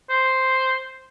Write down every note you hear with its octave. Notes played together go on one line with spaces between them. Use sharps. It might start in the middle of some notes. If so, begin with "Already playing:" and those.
C5